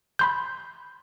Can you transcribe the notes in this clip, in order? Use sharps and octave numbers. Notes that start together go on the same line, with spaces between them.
B5 C6 G6